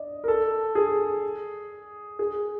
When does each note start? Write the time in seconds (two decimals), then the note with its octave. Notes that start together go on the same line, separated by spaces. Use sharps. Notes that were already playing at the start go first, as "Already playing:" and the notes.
Already playing: D5 D#5
0.24 A#4
0.28 A4
0.75 G#4
2.19 G#4